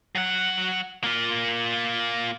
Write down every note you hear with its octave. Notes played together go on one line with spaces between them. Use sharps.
F#3 F#5
A#3 F4